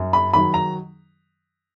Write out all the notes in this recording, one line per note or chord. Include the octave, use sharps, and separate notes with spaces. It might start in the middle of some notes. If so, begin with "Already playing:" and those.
Already playing: F#2
B5
D#3 F#3 B5
A#5